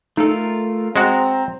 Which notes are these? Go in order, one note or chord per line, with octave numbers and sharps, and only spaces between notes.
A3 D#4 F4 A4 A#4
G#3 C4 F#4 A#5